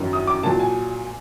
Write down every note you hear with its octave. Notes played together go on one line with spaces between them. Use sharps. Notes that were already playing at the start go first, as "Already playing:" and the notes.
Already playing: F#2 D#3 F#3
D#6
D6
A#2 F#3 A5
G#5